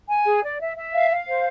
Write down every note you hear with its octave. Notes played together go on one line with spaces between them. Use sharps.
G#5
G#4
D5
E5
E5
F5
F5
C5